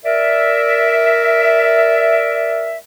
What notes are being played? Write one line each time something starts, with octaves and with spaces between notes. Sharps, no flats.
A#4 D5 E5